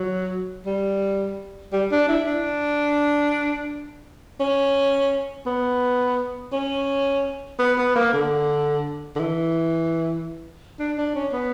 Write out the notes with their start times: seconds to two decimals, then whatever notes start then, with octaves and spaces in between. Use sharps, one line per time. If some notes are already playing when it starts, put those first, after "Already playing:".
Already playing: F#3
0.66 G3
1.73 G3
1.92 D4
2.09 E4
2.26 D4
4.40 C#4
5.46 B3
6.53 C#4
7.59 B3
7.78 B3
7.95 A#3
8.13 D3
9.16 D3
9.19 E3
10.79 D4
10.98 D4
11.15 C#4
11.33 B3